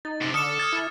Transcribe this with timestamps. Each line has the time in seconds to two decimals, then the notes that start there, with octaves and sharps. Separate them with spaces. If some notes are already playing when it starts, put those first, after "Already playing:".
0.05 D#4 A6
0.21 F#2 C3
0.34 D3 A4 D6 D#6 F6 C#7 E7
0.60 D#6 F6 G#6 A6
0.73 E4